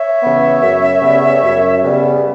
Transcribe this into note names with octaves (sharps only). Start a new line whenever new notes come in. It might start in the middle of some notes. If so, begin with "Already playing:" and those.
Already playing: C#5 E5
C#3 E3 B3
F#2
C#3 G3 B3
F#2
C#3 G3 B3